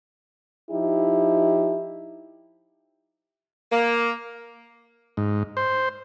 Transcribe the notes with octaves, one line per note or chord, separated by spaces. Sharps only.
F3 D#4 E4 G4
A#3
G#2
C5